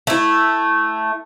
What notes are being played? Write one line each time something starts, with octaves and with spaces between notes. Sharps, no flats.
A3 E4